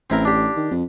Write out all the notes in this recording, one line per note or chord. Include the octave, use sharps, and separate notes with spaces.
A1 C4 E4 A#4
D4 G4
D#3
F2